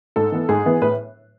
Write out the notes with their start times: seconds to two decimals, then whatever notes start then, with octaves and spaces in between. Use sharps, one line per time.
0.16 G#2 A4
0.32 E3 B3
0.49 G#2 G#4
0.66 E3 B3
0.82 A2 B4